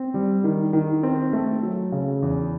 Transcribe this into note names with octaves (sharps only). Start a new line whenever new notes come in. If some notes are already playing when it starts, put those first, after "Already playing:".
Already playing: C4
G3
D#3
D#3
C4
A3
F#3
C#3
E2